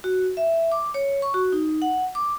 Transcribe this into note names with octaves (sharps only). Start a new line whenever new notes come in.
F#4
E5
D6
C#5
C#6
F#4
D#4
F#5
D6